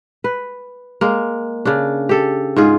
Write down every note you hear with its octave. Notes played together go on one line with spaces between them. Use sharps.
B4
G#3 A#3
C#3 D4
G4 A4
G#2 F4 G#4